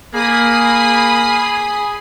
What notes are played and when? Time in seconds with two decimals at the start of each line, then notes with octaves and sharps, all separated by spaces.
0.15 A#3 G#4 B5 D#6 C7